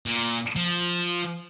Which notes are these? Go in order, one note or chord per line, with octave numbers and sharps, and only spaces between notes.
A#2
F3